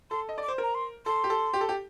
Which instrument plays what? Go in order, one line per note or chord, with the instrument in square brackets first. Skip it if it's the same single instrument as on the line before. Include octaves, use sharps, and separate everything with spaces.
[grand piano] A4 [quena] C6
[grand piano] D#5
D5
[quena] D6
[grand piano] C5
[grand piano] A#4 [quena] A#5
[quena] C6
[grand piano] A4 [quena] C6
[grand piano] G4
A4
G4
A4
G4